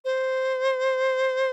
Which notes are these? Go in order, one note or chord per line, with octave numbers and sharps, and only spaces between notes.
C5